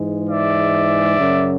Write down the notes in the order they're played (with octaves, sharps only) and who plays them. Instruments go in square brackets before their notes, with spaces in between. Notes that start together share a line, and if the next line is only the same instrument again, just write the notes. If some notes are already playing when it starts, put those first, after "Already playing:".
Already playing: [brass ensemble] G#2 E3 G#3
D5 E5
F#2 C#3 F#3